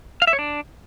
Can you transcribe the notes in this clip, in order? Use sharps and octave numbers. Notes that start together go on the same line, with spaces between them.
F5
E5
C#5
D4